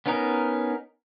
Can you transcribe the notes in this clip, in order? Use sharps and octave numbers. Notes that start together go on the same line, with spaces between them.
B3 C#4 D#4 A#4